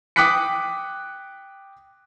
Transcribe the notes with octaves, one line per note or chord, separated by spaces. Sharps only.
G5 D6 D#6 F#6 B6 C#7